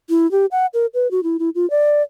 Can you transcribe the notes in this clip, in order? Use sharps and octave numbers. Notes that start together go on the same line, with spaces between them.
E4
G4
F#5
A#4
B4
F#4
E4
E4
F4
D5